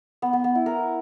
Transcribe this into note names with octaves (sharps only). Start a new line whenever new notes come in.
B3
B3
B3
E4
A#4